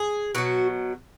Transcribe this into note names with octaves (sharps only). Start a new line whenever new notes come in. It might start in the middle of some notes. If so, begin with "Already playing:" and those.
Already playing: G#4
B2 F#3 F#4